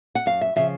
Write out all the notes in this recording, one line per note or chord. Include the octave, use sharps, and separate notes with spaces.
F#5
F#2 F5
E5
C#3 F3 E5